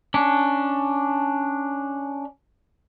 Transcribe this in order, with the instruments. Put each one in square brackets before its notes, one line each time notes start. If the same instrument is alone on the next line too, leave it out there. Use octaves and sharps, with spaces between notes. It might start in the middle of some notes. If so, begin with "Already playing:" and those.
[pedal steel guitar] C#4 D4